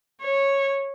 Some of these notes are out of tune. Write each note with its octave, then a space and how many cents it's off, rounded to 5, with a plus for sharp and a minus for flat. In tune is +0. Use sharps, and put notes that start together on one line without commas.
C#5 -10